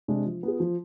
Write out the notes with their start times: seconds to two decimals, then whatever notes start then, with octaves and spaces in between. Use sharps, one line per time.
0.08 C3 G#3 D4
0.26 F3
0.43 B3 F4 G#4
0.60 F3